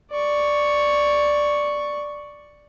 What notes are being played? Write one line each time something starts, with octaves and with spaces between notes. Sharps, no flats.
D5 C#6